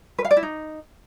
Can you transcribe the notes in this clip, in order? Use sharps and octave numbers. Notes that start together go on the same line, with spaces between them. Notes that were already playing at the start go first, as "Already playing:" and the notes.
B4
F5
D5
E4
D#4